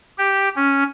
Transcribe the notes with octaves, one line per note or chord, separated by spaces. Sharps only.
G4
C#4